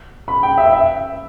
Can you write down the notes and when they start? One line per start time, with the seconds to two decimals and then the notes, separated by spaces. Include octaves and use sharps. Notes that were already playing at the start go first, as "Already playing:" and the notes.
0.28 B5
0.43 G5
0.58 E5
0.73 E5